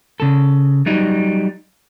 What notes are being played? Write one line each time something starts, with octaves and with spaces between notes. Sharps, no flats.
C#3 A4
F#3 G3 D#4